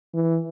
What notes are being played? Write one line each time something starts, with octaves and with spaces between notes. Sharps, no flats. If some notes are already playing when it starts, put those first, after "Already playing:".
E3